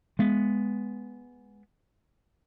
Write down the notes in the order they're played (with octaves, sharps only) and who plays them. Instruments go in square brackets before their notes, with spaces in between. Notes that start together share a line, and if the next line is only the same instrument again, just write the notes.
[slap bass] G#3 B3